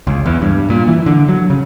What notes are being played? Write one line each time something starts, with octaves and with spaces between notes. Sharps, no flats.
C#2
E2
G2
A#2
E3
D3
F#3
C#3